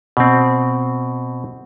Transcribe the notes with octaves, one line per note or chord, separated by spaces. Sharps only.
B2 C4